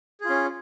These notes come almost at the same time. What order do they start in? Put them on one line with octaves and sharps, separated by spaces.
G#4 F4 C#4